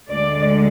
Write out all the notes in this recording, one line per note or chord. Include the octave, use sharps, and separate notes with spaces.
D2 D3 G#3 D5